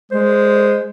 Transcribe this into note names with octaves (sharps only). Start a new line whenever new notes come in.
G#3 C5